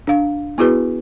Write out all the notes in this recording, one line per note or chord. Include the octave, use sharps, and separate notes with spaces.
D4 F5
B3 E4 F#4 G#4 B4